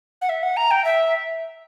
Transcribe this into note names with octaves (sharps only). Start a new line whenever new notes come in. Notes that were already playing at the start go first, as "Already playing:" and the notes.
F#5
E5
F#5
A#5
G5
E5